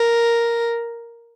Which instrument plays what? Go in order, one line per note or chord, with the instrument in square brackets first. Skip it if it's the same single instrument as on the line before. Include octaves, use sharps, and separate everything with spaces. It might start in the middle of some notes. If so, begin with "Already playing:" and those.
Already playing: [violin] A#4